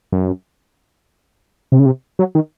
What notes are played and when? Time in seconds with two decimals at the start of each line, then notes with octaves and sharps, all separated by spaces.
0.13 F#2
1.72 C3
1.79 C#3
1.86 C3
2.19 F#3
2.35 D#3